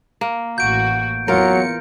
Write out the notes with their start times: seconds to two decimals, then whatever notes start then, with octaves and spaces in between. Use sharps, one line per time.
0.21 A#3
0.58 A1 F#4 G6 D7
1.28 E2 F#3 F4 A#4 C#7